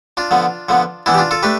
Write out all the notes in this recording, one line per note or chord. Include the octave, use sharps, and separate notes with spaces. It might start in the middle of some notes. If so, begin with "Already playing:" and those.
D4 F4
D3 F3 B3
D3 F3 B3
E3 B3 D4 E4
G4
D4 F4
F4 A4
A3 D4 G4 B4